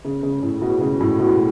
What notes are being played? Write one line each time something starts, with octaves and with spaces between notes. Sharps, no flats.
C#3
C#3
A2
B2
C#3
A2
B2